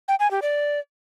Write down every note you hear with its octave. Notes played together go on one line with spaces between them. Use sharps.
G5
G#5
G4
D5